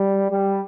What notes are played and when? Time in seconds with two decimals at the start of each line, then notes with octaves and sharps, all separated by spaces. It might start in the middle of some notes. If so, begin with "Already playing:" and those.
Already playing: G3
0.30 G3